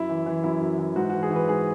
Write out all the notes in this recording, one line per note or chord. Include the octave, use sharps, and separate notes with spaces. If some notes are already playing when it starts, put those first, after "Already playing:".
Already playing: F#2 E4
E3
E3
F#2 E4
F#2
E3
G#2 F#4
E3 F#4
G#4
E3
B4
G#2 G#4